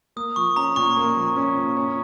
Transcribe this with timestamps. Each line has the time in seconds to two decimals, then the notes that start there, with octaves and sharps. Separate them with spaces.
0.16 A#3 D#6
0.36 F3 C#6
0.56 C#4 A#5
0.76 A#2 C#6
0.97 A#3
1.17 F3
1.36 C#4
1.56 A#2
1.77 C#4